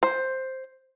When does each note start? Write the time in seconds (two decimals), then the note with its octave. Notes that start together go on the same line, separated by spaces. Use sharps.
0.03 C5